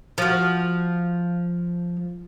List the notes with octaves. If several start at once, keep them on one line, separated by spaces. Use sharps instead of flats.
F3 F#4